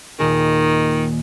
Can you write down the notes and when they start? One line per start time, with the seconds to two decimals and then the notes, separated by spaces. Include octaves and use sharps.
0.20 D#2 A#2 D#3 G#4